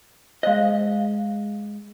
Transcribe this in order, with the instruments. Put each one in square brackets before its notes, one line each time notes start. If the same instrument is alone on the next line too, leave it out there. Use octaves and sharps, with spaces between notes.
[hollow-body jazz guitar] G#3 D#5 [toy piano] C5 F5